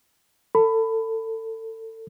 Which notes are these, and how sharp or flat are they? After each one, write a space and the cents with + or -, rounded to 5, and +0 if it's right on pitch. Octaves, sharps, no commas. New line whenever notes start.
A4 +30 B5 +15